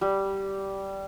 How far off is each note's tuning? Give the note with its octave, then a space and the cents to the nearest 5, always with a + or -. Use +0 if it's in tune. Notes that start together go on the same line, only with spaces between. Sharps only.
G3 -10